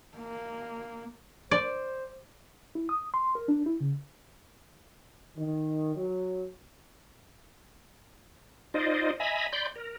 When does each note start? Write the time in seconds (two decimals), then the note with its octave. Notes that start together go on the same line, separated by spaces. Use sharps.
0.17 A#3
1.51 C5 D5
2.75 E4
2.89 D#6
3.14 C6
3.35 A#4
3.48 D4
3.66 E4
3.81 C#3
5.36 D#3
5.96 F#3
8.74 D#4 F4 C5 D5 D#5
9.20 D#5 E5 G#5 A#5 B5
9.53 D5 B5 C6 G6
9.76 A#4